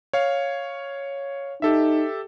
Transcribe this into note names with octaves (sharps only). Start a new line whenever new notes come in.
C#5 F5
D#4 G4 A4 E5